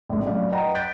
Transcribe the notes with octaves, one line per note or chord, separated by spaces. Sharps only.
A#1 F2 A2
F#3 C#4 D5 F5
B4 D#5 F#5 G5 A#5
F#6 G6 A6 B6 D7